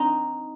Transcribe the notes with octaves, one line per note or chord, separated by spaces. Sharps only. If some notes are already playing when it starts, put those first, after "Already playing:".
Already playing: C4 D#4